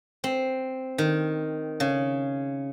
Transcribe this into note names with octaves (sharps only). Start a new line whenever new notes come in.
C4
D#3
C#3